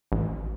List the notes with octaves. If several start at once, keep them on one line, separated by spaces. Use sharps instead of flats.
A1